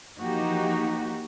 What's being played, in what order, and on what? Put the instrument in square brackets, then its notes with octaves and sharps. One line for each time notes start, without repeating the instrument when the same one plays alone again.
[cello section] E3 F3 A#3 D#4 F#4 G4